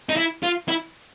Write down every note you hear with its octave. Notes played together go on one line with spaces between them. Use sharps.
D#4
E4
F4
E4